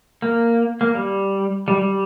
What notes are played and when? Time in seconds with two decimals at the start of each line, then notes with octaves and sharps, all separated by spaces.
0.22 A#3
0.81 A#3
0.95 G3
1.68 G3
1.81 G3